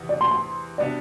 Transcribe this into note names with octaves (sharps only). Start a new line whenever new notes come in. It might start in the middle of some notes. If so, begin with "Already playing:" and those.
Already playing: E2 C3 E3
D5
C6
C6
C3 G3 B3 D4 F#4 D5